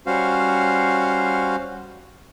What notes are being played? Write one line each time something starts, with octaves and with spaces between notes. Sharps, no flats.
G3 C#4 F#4 C5 F5